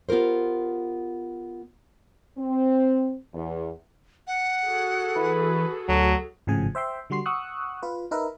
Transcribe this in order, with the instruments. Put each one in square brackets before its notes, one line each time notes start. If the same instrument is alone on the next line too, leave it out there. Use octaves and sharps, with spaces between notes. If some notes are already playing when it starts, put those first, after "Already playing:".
[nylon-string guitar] B3 F4 G4 A#4 C5
[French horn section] C4
E2
[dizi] F#5
[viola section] F#4 G#4 A4
[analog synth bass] E3 [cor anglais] B4
[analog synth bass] D2 [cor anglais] F#3 [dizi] A5
[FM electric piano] G#1 A2 C#3 F3 G#4 G#5
C5 E5 G5 C6
D3 G3 F#4 C6 C7
F#5 C#6 D#6 E6 F#6
F4 B4
D#4 A#4 B4 E5